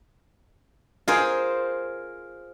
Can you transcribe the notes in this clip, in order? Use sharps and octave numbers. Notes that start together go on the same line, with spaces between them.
F4 G#4 A#4 C5